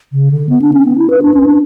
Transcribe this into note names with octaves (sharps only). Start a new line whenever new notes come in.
C#3
D3
B3
D4
C#4
B3
E4
B4
D4
C#4
D4